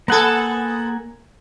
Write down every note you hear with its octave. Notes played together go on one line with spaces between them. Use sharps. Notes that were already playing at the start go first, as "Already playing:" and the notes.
A#3 B3 A4 F#5 G#5